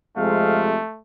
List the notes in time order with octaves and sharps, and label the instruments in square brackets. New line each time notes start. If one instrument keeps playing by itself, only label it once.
[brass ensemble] F2 C3 G#3 [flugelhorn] A3 [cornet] F5